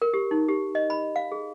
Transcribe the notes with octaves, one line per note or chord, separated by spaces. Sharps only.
A#4
G4
D#4
G4
D#5
B5
F5
G#4